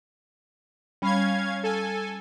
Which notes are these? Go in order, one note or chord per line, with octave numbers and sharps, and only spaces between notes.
G3 C#4 F5 B5 G#6
A4 G#5